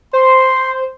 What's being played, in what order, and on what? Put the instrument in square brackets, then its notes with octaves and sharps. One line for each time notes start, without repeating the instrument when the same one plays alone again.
[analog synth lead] C5 [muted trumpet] C6